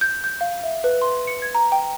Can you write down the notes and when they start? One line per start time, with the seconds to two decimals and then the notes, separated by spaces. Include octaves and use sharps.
0.01 G6
0.24 G6
0.41 F5
0.64 E5
0.84 B4
1.02 C6
1.27 C#7
1.42 G#6
1.55 A#5
1.72 G5